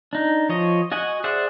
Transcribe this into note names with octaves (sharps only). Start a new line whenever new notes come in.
D4 D#4
F3 C#5 D#5
F#4 D#5 F#5 G#5
G#4 C5 D5 E5 F#5